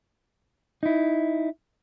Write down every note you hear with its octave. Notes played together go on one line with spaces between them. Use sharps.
D#4 E4